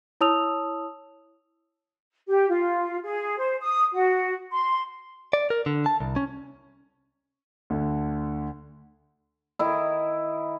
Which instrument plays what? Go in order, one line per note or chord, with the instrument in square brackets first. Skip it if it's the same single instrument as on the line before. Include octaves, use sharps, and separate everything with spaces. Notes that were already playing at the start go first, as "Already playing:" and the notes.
[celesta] E4 C#5 A5 D#6 E6 F7
[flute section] G4
F4
G#4
C5
D#6
F#4
C6
[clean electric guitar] D5
A#4
D3
A5
C2
C#4
[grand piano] D2 D3
[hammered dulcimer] D#3 E4